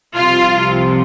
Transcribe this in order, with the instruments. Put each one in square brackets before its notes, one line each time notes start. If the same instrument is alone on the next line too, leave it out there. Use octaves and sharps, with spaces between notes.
[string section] C2 C3 F3 [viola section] F4